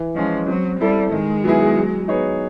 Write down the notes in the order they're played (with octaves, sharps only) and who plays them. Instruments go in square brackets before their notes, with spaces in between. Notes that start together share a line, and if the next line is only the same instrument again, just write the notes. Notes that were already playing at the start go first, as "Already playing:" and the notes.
Already playing: [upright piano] E3
[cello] F3 [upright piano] G#3 C#4
[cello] F#3 [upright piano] C4
[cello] G3 [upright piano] E4 A4
[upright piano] D#3 [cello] G#3
[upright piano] F#3 B3 E4 G#4
F#3
B3 D#4 G#4 C#5